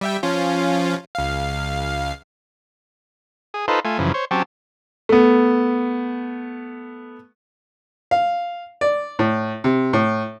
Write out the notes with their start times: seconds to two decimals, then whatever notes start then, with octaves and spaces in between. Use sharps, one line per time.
0.01 G3 E5 G5
0.23 F3 C#4 F4
1.15 C#2 F5
3.54 G#4
3.68 D#4 F4 A4 B4 C5
3.85 A3 F4 G#5
3.98 F#2 C#3 E3 F3
4.14 C5 C#5
4.31 F#3 C4 C#4 G4 A5
5.09 A3 B3
8.11 F5
8.81 D5
9.19 A2
9.64 C3
9.93 A2